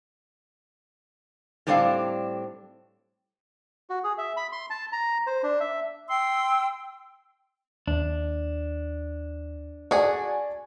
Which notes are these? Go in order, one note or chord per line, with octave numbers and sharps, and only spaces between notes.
A2 G3 C4 D4 A4 F5
F#4
G#4
E5
B5
C6
A5
A#5
C5
D4
E5
G5 C6 E6
D#2 D4
F#4 G#4 D5 G#5 A5